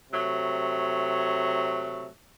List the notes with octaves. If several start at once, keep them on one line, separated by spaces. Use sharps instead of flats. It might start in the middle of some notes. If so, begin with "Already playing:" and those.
C3 F#3 A3